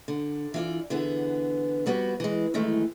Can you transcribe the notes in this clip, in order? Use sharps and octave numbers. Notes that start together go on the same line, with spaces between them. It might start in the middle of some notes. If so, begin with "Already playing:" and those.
D3
E3 F4 D5
D3 E3 B3 G#4
F2 G3 B3 F#4 B4
E3 G#3
F#2 D#3 E3 G#3 A3